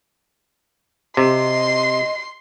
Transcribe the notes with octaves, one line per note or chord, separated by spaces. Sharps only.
C3 D#5 C6